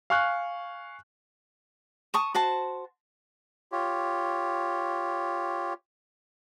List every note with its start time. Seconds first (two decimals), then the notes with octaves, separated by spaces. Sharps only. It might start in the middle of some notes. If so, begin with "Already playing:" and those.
0.10 F5 G#5 C#6 F6 F#6
2.14 A5 C#6 D#6
2.35 F#4 C5 A5
3.72 F4 G4 C#5